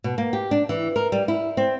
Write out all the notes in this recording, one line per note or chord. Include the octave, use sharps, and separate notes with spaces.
B2
A#3
G4
D4
E3
A#4
G3
E4
C4